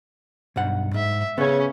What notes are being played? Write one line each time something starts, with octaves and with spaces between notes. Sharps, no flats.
B1 G2 F#5
G#2 E5
C#3 B3 C#4 C#5